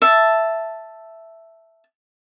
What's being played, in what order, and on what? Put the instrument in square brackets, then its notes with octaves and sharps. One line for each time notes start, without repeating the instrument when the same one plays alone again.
[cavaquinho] E5 A5